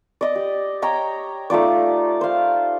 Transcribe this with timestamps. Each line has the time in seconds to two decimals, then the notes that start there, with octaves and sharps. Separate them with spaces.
0.21 D5 D#5
0.36 G4
0.82 C#5 D#5 G5 A#5
1.50 A3 D#4 F4 D5
2.21 C5 F5